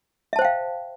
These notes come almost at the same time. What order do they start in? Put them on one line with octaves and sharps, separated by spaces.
E5 A5 C5 G5 F5